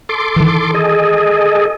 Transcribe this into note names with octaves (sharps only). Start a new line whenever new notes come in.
A4 C6 D6
D#3 E3
G#4 A4 D#5